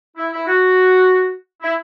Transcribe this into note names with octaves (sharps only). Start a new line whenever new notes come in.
E4
E4
F#4
E4